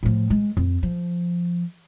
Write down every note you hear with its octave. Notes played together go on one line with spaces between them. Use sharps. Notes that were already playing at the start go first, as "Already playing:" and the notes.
A2 F3
G#3
F2
F3